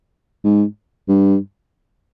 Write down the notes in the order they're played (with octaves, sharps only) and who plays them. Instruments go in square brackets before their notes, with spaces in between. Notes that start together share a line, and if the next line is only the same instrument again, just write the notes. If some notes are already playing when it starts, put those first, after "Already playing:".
[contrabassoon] G#2
G2